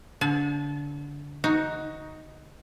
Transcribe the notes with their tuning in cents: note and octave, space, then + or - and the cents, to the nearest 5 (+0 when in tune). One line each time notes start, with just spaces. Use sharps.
D3 -25 A5 -45
D#4 +10 F#4 +0